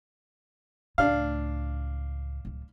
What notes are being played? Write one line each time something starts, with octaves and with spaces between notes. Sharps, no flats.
C#2 A2 D4 F5
D1 C#2